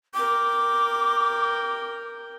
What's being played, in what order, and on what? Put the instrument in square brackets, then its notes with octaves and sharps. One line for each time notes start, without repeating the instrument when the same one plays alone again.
[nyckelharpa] A#4 G5 [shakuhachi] D6